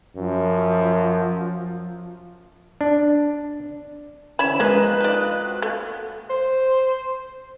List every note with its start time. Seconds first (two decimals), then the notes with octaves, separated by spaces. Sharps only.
0.17 F#2 F3
2.81 D4
4.39 D3 E3 C4 C#4 C#5 B5 E7
4.60 F3 G#3 A#3 B4 A#5 F#6 G6
5.01 D#4 F4 D5 D#5
5.44 C4 F#4
5.62 A3 A#3
6.30 C5